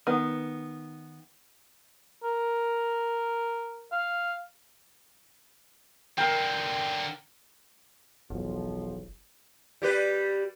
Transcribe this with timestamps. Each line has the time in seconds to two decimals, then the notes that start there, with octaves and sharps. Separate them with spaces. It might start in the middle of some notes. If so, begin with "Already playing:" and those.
0.07 D#3 B3
2.23 A#4
3.92 F5
6.18 D3 C4 A#4 G5
8.30 F#1 B1 E2 F3
9.82 G3 G4 B4